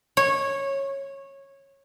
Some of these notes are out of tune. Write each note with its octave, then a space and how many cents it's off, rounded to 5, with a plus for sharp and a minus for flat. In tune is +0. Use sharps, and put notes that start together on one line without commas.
C#5 -15